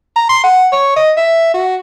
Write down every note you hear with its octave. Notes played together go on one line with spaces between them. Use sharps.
A#5
C6
F#5
C#5
D#5
E5
F#4